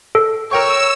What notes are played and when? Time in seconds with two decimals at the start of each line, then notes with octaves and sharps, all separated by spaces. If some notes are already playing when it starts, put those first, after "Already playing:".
0.15 A4
0.51 A#4 C#5 G5 C#6 E6